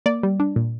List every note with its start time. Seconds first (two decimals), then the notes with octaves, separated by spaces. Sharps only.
0.06 A#3 D5
0.23 G3
0.40 D4
0.56 A#2